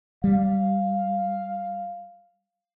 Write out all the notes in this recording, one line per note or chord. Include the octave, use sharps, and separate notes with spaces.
G3 F5